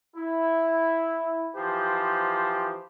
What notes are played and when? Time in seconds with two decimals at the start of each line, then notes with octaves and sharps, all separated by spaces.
0.16 E4
1.56 E3 F3 G4 C5